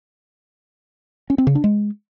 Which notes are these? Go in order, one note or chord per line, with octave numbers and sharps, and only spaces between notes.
C#4
C4
C#3
D4
G#3